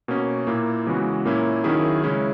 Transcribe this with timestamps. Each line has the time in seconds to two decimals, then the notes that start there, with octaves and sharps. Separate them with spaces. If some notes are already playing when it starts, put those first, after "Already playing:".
0.08 B2 A#3 C#4
0.47 A#2 A#3 E4
0.86 C#3 E3 G#3 B3 F#4
1.25 A#2 A#3 C#4 E4
1.64 D#3 F#3 C#4 E4 G#4
2.03 C#3 G#3 C#4 E4